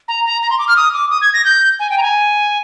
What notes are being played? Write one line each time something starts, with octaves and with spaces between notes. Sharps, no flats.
A#5
A#5
A#5
C6
D6
F6
D#6
D6
D#6
G#6
A#6
G6
G#5
G5
A#5
G#5